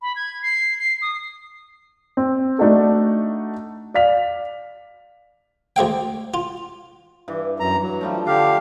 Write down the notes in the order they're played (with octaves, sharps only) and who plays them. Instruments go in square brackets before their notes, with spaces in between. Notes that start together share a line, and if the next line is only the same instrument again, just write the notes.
[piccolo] B5
G#6
C7
C7
D#6
[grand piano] C4
A3 D4 D#4 F#4 A4
D5 F5 B6 F7
[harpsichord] D2 G#3 F5 G5
F4
[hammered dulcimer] G2 E3
[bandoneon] F#2 A#5
F#3
[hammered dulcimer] F3 G3 A3
[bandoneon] D3 G4 F5 [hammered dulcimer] D4